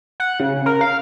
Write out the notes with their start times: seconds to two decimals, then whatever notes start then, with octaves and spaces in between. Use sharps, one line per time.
0.20 F#5
0.40 C#3
0.66 A#4
0.81 F5